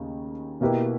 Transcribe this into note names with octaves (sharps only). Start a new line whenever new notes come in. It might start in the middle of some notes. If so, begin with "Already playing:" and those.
Already playing: D#2 C#3 D#4
B2 A#3 E4 G4 B4